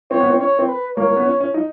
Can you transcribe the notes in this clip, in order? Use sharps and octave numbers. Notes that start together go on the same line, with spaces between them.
C4 C#5
B3
C4
C#4 C#5
C4
B4
A#3 C#5
A#3
B3
C#4
C#4
D#4